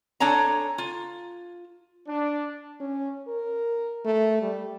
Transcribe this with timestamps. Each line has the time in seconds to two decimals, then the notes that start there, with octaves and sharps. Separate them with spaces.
0.20 D4 A4 C#5 G#5 A#5
0.78 F4
2.08 D4
2.80 C#4
3.28 A#4
4.05 A3
4.42 G3